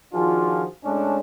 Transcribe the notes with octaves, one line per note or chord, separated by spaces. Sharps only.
D#3 F3 D4 F4 F#4 G#4
A2 G#3 C#4 D4